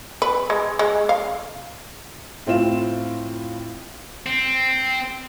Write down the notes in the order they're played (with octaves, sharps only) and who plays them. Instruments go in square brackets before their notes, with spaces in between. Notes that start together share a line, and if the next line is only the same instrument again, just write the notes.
[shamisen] B4
G#3
G#3
F5
[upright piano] A2 C4 F4 E7
[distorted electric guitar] C4